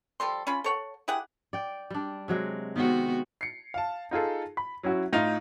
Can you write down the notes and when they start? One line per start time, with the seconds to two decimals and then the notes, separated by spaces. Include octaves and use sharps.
0.20 F3 G3 A4 C6
0.47 C#4 F4 B5
0.64 A4 C#5 F#5
1.08 E4 G4 G#4 F#5
1.53 D5 G5
1.90 G3 D4
2.28 C3 F#3 G#3
2.76 D#3 G#3 B3 C4 F#4
3.41 C7 C#7
3.74 F5 A5
4.11 D#4 F4 G#4 A4
4.57 B5
4.83 F#3 C#4 E4 F#4
5.13 A2 D#4 F4 F7